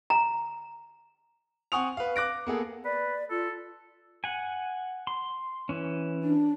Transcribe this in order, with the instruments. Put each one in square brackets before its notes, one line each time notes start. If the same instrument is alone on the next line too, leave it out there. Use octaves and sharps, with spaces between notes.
[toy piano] A#5
[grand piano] C4 F#5 G#5 C#6 D#6 F7
B4 F5
D6 F#6 A#6 D7
A#3 B3 G#4 A4
[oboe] B4 [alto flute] D5
[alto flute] F4 [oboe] A4
[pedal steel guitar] F#5 G#5
C6
E3 C#4
[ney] D4